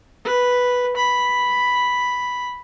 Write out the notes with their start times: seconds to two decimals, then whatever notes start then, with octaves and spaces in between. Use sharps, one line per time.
0.24 B4
0.96 B5